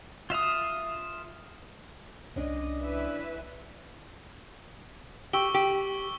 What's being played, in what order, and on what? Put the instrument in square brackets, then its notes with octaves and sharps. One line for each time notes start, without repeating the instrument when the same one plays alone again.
[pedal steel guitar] F4 E5 F5 D#6
[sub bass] C2 [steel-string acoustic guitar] C#4 D4 D5 [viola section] D#5
[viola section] E3 B4 E5
[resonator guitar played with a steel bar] G4 [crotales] C#6 E6 G7
[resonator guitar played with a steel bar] G4